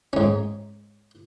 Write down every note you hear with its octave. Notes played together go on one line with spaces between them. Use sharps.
G#2 C#4